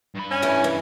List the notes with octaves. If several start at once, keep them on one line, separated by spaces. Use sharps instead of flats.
G2 B5
C#4 G#5
E3 A3 E4
E3